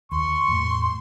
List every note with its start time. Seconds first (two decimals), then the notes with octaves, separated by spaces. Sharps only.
0.12 D#2 C6 C#6
0.48 E2 A2